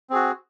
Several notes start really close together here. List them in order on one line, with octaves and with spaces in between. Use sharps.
C4 G#4 F#4